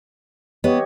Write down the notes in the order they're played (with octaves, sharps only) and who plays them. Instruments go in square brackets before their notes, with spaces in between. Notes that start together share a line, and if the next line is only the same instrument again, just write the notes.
[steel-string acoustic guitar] B3 [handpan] G4 C#5 D#5